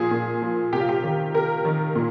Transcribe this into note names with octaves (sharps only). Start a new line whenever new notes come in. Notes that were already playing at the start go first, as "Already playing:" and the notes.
Already playing: A#2 F3 G#4
A#2
F3
C3 G4
F4
G4
D#3
C3 A#4
D#3
A#2